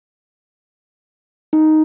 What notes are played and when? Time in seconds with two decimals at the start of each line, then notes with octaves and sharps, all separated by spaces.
1.53 D#4